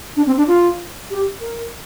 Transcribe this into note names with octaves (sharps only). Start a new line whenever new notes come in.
D4
C4
D4
F4
G4
A#4